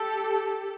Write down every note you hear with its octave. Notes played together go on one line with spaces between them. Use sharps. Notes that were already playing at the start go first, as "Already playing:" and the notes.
Already playing: G4 A4